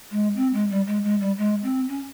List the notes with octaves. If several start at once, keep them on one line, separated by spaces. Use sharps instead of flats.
G#3
C4
G#3
G3
G#3
G#3
G3
G#3
C4
C#4